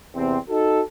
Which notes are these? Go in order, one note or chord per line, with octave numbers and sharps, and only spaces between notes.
E2 C3 C4
D#4 F#4 A4